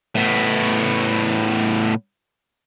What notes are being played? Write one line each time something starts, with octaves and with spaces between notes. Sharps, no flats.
A2 B3